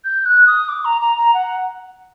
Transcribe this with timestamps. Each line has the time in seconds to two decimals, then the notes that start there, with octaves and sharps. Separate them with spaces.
0.04 G6
0.25 F#6
0.46 D#6
0.68 D6
0.84 A#5
1.01 A#5
1.17 A#5
1.33 F#5